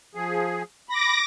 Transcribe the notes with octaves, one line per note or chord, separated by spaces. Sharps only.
F3 G#4
B5 D6 A#6